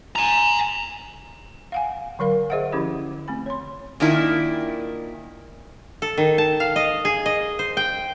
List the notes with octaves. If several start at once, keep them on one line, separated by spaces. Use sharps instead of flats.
G#5 A#5
F5 F#5 G#5
D3 F#3 A#4 F5
G#4 C5 D#5 E5 F#5
D3 F3 C#4 E4 G4 D5
A3 C4 B5
C#5 C6
A#2 D#3 D4 E4
A4
D#3
A5
F5
D#5
G#4
D#5
C5
G5